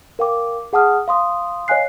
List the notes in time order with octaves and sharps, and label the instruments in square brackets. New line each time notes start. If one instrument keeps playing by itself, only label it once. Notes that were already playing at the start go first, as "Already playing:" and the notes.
[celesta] A#4 F5 G5 D6
G#4 F#5 A5 D#6 F6
F5 C6 D#6
C#5 D#5 F5 G#5 F#6 C7